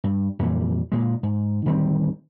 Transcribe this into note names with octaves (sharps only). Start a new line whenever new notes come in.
G2
F2 A#2 E3 G3
A#2 G#3
G#2
D1 D#3 G3 C4